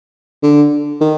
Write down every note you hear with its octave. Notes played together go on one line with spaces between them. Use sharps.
D3
D#3